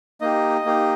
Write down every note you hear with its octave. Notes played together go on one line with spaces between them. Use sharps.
A#3 D#4 G4 D#5
A#3 D#4 G4